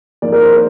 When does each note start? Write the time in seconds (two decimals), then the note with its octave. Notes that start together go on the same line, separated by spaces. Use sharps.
0.22 F2 D#3 A#3 D5
0.32 A#4
0.43 C5
0.54 A#4